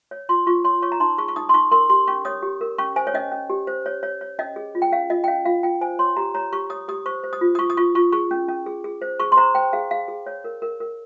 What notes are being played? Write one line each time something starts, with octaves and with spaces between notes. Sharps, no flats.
C#5
F4 C6
F4 C#6
C#5 C6
C#5 C#6
A#5
D#4 C6
G#4 C#6
C#6
D#4 D#6
C6
D#4 C#6
A#4 C6
G4 C6
C#4 C#6
C#5 D#6
G4
A#4
C#4 C#6
C5 G#5
C#5
C#4 D#5
C#4
G4
C5
C#5
C#5
C#5
C#4 D#5
G#4
F4
G5
C#4 F5
F4 D#5
G5
C#4 F5
F4 F5
F4 G5
C5 G#5
C#5 C6
G4 A#5
C#5 A#5
G4 C#6
C#5 D#6
G4 D#6
C5 C#6
C5
D#6
F4
D#6
F4 C#6
D#6
F4 C#6
F4 C#6
G#4 C#6
C#4
C#4
G#4
G#4
C5
G#4 C#6
C6
C5 A#5
C5 G5
G#4 F5
G#4 F5
G#4
C#5
A#4
A#4
A#4